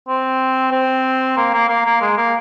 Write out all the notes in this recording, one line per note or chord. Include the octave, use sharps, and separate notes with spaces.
C4
C4
A#3
A#3
A#3
A#3
G#3
A#3